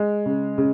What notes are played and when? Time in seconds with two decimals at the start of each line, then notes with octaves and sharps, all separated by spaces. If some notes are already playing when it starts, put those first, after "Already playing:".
Already playing: G#3
0.26 C#3
0.58 C#3